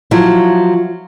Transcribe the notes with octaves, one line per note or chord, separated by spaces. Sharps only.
F3 F#3 E4